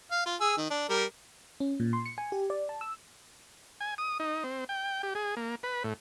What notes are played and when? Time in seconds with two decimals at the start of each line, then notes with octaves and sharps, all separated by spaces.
0.11 F5
0.26 F4
0.41 G#4 E6
0.57 D#3
0.71 D4
0.89 G3 A#4
1.60 C#4
1.80 A#2
1.93 C6
2.06 C#7
2.18 G#5
2.32 G4
2.50 D5
2.69 A5
2.81 E6
3.81 G#5
3.98 D#6
4.20 D#4
4.44 C4
4.69 G5
5.03 G4
5.15 G#4
5.37 A#3
5.63 B4
5.84 A2